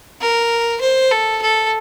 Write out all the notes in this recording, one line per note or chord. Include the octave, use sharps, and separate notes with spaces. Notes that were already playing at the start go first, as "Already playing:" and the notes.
A#4
C5
A4
A4